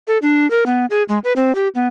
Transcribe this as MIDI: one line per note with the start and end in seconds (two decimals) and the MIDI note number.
0.08 0.18 69
0.22 0.49 62
0.51 0.64 70
0.66 0.86 59
0.90 1.03 68
1.09 1.19 56
1.24 1.33 71
1.36 1.55 60
1.55 1.68 67
1.75 1.87 59